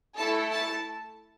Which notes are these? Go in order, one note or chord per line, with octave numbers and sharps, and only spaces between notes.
A3 E4 A4 A5
A5